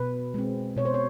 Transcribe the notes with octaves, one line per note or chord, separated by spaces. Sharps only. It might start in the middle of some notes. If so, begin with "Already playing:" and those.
Already playing: B2 B4
G#3 C4
B2 C#5
C5
C#5